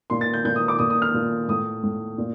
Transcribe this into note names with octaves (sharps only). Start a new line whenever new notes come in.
A#2 C6
A6
G6
A#2 G6
D#6
D6
A#2 D#6
D#6
F6
A#2
A2 D#6
A2
A#2